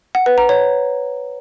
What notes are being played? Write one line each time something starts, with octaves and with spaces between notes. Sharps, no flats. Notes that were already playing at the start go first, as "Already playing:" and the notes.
F#5
B4
A#5
C#5